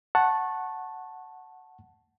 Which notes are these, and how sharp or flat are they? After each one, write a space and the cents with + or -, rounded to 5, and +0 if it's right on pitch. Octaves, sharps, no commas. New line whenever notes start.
F#5 +0 A5 +0 C#6 -25